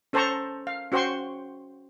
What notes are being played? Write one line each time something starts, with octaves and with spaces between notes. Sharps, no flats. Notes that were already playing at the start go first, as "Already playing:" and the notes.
C#4 A4 C5 A5 A#5 C#6
F5
C#4 F#4 C5 G5 C6 C#6